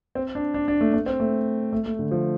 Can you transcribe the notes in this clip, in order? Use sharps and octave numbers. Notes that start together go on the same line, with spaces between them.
C4
D4
D4
D4
A3
A3
C4
A3
A3
A3
D3
F3